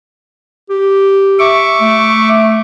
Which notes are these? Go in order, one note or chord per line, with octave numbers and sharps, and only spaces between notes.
G4
E5 C#6 D6
A3